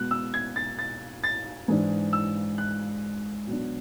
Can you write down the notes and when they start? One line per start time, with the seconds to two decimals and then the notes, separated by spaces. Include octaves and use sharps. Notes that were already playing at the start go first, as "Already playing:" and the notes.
Already playing: B2 G#3 B3 F#6
0.11 E6
0.34 G#6
0.56 A6
0.79 A6
1.24 A6
1.68 G#2 E3 G#3 D4
2.13 E6
2.58 F#6
3.47 B2 F#3 B3 D4